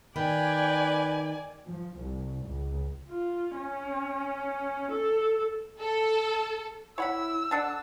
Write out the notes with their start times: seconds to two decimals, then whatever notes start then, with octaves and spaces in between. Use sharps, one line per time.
0.16 D#3 B4 D5 G5 G#5
1.67 F3
1.99 C2
2.45 C#2
3.09 F4
3.56 C#4
4.92 A4
5.78 A4
6.98 E4 C#5 F#5 B5 E6
7.51 D3 D4 F#5 A5